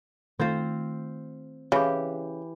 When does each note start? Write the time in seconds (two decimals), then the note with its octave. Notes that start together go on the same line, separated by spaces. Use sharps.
0.40 D#3 A3 C4 F4 C5
1.72 C#3 E3 G4